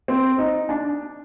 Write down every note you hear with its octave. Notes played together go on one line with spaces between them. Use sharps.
C4
D#4
D4